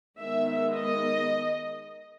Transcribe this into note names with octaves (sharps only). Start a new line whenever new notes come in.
D#3 G#3 B3 E5
D#5